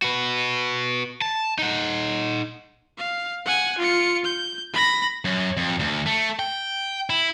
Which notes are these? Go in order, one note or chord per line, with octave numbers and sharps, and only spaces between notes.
F#4 B4
A5
D#4 F#5
F5
F#5 G#5
F4 C#7
G6
B5 A#6
F#2
F2
D2
A3
G5
E4